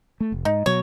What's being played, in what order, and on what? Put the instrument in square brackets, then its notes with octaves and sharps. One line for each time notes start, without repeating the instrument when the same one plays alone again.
[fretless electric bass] A3
F1
[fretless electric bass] G#2 [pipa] D#4
[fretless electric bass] B2 F#3 [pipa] C#5